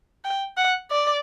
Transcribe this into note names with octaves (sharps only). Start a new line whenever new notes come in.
G5
F#5
D5